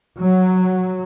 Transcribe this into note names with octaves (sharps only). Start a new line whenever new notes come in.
F#3